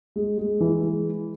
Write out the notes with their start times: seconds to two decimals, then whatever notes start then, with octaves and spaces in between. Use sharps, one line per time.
0.16 G#3
0.38 G#3
0.61 E3
0.83 G#3